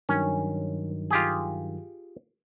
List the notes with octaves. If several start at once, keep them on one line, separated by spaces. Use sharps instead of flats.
G2 D#3 F#3 C#4
F4 G4 G#4